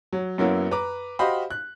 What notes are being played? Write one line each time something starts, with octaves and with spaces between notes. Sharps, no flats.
F#3
F#2 F#3 A#3 B3 E4
B4 A#5 D6
F#4 G4 C5 D#5 F5 B5
F#6